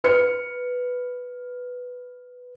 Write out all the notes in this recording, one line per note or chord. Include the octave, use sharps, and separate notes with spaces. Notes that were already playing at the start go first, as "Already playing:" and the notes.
B4 F6 C#7